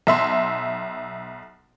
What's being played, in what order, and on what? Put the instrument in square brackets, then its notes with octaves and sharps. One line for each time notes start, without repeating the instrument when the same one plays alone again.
[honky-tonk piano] B1 E5 C6